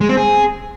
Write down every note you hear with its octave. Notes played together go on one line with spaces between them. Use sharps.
G#3
C4
G#4